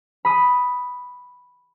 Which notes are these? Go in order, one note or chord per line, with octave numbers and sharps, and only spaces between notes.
B5 D#6